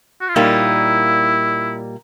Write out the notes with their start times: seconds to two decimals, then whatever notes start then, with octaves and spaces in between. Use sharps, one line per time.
0.21 F#4
0.28 F4
0.36 A#2 G3 A#3 D#4 E4